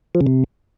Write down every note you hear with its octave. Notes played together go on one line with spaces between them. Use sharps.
F3
C#3
C3